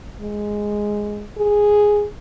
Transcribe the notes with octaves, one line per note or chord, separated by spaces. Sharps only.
G#3
G#4